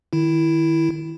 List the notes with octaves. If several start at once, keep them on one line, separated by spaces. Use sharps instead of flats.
D#3 E4